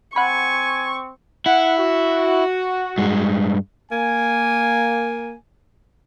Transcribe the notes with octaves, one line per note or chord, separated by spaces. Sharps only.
C4 F#5 G#5 B5 C#6
E4 F#5
F#4
G2 G#3
A#3 G#5